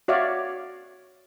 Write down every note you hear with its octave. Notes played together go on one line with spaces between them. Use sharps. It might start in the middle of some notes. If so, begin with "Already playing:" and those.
F#4 C#5 D5 E5 F5